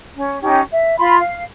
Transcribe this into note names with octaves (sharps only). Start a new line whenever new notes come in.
C#4
C#4 D#4 G4 G5
E5
F4 B5 C6
F5